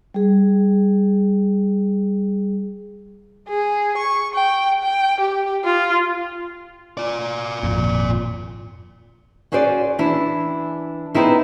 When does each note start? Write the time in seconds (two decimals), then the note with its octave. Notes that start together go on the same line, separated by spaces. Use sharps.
0.14 G3 G#4
3.48 G#4
3.97 C#6
4.34 G5
4.82 G5
5.20 G4
5.64 F4
6.97 F4 D5
7.63 G#1 F2 A#2
9.52 C#4 F#4 G#4 C5 D5
9.99 E3 D4 E4
11.14 B3 C4 D#4 E4 G#4